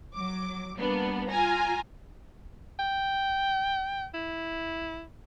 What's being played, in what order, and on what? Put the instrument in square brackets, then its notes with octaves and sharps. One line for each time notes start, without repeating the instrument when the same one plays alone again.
[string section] F#3 D6
G3 A#3 B3 D4
F4 G#5 A#5
[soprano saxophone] G5
E4